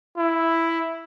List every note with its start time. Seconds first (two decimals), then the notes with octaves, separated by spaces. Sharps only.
0.17 E4